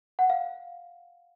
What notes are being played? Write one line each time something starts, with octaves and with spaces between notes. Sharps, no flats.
F#5
F5